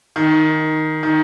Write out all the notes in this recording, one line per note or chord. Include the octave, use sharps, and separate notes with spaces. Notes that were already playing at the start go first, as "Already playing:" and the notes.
D#3
D#3